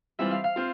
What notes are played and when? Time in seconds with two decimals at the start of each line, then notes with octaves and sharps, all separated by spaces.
0.19 E3 G3 C4 F4 E5
0.31 F5
0.44 F5
0.56 C4 F4